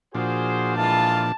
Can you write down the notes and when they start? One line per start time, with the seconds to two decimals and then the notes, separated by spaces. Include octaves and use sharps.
0.15 A#2 F3 D4 F#4 G#4 C5
0.76 E3 G#3 F4 A5